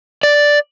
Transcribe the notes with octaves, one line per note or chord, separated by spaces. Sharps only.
D5